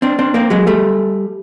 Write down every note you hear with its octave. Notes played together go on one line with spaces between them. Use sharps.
C4 D4
C4 D4
A#3 C4
F#3 G#3
G3 A3